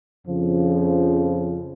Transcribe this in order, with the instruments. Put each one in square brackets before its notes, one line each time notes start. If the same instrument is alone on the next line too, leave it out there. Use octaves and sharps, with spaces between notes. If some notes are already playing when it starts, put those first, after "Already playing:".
[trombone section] F2 C#3 F3